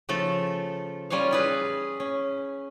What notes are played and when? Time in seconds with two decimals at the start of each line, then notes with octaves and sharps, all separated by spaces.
0.09 C#3 F3 A3 A4
1.10 G3 C#4 F4 C#5 F5
1.31 E4 G#4 B4
2.00 C#4